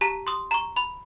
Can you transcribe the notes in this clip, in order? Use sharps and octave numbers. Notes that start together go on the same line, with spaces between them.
G4 A5 A#5 B6
C6 D#6
A#5 C#6
B5